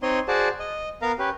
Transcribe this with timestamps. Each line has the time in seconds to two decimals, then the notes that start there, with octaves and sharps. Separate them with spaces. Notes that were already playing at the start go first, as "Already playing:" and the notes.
0.03 C4 D#4 C#5 D#5 C6
0.28 F#4 G#4 C5 D5 A5
0.60 D#5
1.02 B3 A#4 F5 A#5
1.19 C#4 G4 B4